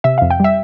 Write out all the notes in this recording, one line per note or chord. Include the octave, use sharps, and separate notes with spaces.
C3 E5
F2 F5
G5
G3 E5